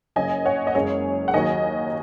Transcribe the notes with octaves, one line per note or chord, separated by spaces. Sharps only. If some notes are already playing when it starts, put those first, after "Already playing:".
F#1 F#2 C#3 D#5 G#5
C#5 F#5
D#5
F#1 F#2 C#3 G#3 G#4 C#5
F#5
D#2 D#3 F#3 D#5 G#5